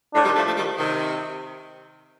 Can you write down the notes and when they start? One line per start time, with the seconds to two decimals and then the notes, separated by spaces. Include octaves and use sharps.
0.14 A2 D4
0.25 D#3 G3
0.36 F3 A3
0.46 F3 A3
0.56 D#3 G3
0.78 C3 D#3